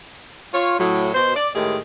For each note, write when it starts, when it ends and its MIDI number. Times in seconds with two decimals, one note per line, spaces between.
0.53 0.74 65
0.53 0.74 73
0.78 1.09 45
0.78 1.09 54
1.15 1.34 47
1.15 1.34 72
1.35 1.48 74
1.55 1.77 45
1.55 1.77 51
1.55 1.77 56
1.55 1.77 57
1.55 1.77 67
1.55 1.77 68